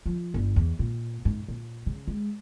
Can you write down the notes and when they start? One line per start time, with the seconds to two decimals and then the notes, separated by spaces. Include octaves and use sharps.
0.06 F3
0.34 G1
0.56 E2
0.79 A#2
1.25 G#2
1.48 A#2
1.86 C#3
2.08 G#3